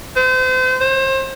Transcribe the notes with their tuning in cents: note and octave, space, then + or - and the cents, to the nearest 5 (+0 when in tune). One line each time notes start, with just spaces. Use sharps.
C5 -35
C5 +30